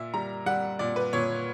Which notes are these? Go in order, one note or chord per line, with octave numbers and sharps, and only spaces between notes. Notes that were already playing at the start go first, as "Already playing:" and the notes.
Already playing: A#2 E5
G3 A#5
G3 F#5
A#2 D5
B4
A#2 C#5